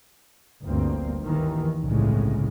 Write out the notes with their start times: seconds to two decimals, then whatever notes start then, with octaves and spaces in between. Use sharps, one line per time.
0.64 G1 D2 G2 A#3 C4
1.23 D#2 D#3 E3
1.83 G1 C2 A2 C#3 G#3